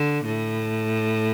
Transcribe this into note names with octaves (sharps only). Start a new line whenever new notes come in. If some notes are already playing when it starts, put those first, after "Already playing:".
Already playing: D3
A2